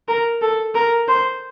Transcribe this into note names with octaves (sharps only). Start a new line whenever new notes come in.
A#4
A4
A#4
C5